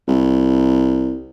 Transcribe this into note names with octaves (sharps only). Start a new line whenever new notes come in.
C2